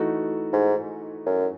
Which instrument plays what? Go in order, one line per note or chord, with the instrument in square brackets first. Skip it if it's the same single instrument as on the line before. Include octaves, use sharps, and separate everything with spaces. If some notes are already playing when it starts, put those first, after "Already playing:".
Already playing: [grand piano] E3 A3 D#4 F#4
[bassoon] G#2
F#2